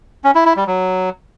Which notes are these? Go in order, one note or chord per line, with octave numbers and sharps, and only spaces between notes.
C#4
E4
E4
G3
F#3